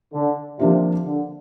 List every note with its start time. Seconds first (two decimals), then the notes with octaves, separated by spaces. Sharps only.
0.13 D3
0.59 C3 F3 A#3 D4 F4
1.06 D3